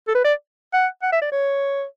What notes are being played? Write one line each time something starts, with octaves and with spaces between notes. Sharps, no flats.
A4
B4
D5
F#5
F#5
E5
D5
C#5